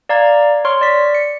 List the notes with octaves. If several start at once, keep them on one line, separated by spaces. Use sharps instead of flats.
D5 F5 A#5 G#6
C#5 C6 C#6 F6
D5 B6
C#7